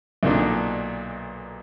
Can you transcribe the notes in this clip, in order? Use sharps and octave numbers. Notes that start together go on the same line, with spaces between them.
B1 A#2 D3 D4 D#4